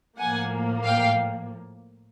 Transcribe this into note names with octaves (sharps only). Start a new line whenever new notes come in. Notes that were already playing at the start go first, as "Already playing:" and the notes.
A2 F3 A#3 F#5 G#5
F5 G5